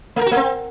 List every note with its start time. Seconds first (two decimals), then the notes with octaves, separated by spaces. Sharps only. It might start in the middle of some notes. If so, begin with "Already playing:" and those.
0.16 A3
0.21 A#4
0.26 F#4
0.31 A3
0.36 C4